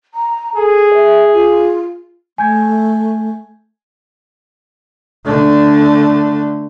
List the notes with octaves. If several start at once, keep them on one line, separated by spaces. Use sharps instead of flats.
A#5
G#4 A4
E5
F4
A3 G#5 G6 G#6
D3 A3